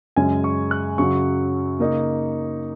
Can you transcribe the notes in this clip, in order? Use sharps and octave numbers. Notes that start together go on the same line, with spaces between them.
F#2 C#3 G#3 C#4 G#5
C#6
F#6
F#2 C#3 F#3 C#4 C#6
C#3 A#3 D#4